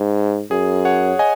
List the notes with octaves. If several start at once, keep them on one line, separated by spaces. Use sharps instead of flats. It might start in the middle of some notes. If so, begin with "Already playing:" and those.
Already playing: G#2
F#2 G#4
C#5 F#5
D#5 G#5